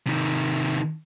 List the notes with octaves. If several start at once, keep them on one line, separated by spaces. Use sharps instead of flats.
C3 D#3